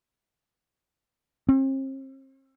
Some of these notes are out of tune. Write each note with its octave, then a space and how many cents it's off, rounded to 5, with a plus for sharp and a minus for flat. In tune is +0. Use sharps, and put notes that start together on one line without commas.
C4 +40